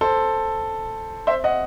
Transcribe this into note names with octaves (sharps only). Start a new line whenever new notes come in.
A4 C5
C5 E5
D#5 F#5